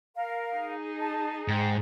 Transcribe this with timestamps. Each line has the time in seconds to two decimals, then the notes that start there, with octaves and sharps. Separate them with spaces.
0.15 A#4 F5
0.54 D#4 G#4
1.00 A5
1.48 G#2 G5